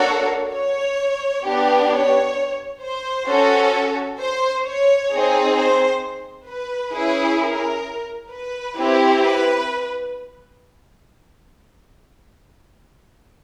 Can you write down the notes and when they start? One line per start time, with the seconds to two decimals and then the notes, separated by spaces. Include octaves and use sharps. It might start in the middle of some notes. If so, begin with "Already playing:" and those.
Already playing: A#3 D4 F#4 A4 C#5
0.53 C#5
1.45 B3 D4 G4
1.90 C#5
2.82 C5
3.27 C#4 F#4 A4
4.19 C5
4.65 C#5
5.10 C4 D#4 G#4
5.57 C5
6.48 B4
6.94 C#4 E4 G#4
7.39 A#4
8.31 B4
8.77 C4 E4 G4
9.22 B4